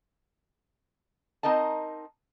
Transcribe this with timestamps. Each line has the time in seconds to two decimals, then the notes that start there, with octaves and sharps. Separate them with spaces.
1.43 C4 D#4 A#4 D#5 A5